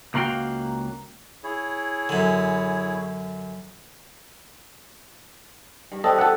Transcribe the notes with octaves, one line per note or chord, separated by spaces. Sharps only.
C#2 A#3 F#4 F5 G5
E4 G#4 C#5
F#2 D3
G2
C4 D4 G4 A4 D#5
B3 A4 F#5